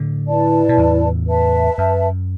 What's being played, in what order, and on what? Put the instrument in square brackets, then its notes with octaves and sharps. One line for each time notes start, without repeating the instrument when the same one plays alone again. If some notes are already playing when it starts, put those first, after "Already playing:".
Already playing: [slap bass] A2 D3
[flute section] E4 B4 D5 A5
[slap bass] B2
E2 A2
[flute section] B4 E5 A5
[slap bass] F#2